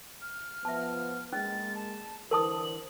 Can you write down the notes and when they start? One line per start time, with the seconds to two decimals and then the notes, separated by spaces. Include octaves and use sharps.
0.21 F6
0.65 F3 B3 E5 A5
1.33 G#3 A#3 C#4 A6
1.75 A5
2.31 D3 E3 A#4 C5 A5 D#6 F#7